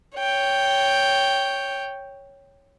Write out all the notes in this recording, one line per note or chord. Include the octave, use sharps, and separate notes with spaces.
C#5 G5